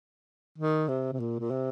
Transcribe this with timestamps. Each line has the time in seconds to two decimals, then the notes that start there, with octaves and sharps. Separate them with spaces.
0.58 D#3
0.89 C3
1.13 C3
1.20 A#2
1.40 A#2
1.50 C3